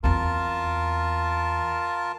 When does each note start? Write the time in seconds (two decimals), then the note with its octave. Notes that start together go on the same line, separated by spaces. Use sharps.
0.04 E2 C4 F4 A#4 A5